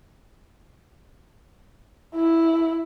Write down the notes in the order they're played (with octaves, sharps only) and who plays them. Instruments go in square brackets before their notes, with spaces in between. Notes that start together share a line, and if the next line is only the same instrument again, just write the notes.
[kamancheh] E4